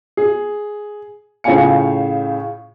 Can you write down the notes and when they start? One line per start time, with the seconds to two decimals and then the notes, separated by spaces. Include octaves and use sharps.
0.17 G#4
1.44 A2 C#3 F4 F5 G#5 C#7